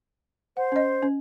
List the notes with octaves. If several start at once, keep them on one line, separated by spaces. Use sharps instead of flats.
C5 F#5
C#4 D#5
C#4